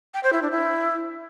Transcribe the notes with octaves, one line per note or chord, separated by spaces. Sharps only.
G5
C5
E4
D4
E4